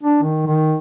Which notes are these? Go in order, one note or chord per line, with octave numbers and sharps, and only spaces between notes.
D4
D#3
D#3